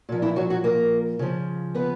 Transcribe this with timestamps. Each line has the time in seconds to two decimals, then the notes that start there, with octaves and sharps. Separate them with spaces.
0.09 A#2 F3
0.22 E3 E4
0.36 F#3 F#4
0.50 F#3 F#4
0.64 A#3 A#4
1.19 C#3 F3
1.75 B3 B4